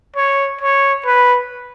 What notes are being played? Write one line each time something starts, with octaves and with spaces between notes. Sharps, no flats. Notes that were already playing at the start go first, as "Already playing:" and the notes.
C#5
C#5
B4